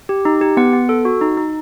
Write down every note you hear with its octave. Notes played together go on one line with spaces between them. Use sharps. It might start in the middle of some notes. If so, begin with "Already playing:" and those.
G4
D#4
G4
B3 F#5
B3
A4
F#4
D#4
D#4